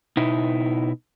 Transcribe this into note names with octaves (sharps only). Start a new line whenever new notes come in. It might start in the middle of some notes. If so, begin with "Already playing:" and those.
B2 D#4 E4